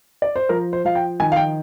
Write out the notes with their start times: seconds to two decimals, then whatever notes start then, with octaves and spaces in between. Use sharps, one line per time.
0.22 D5
0.36 C5
0.49 F3 A#4
0.73 C5
0.85 F3 F5
0.95 G5
1.20 D#3 G#5
1.32 F5
1.36 G5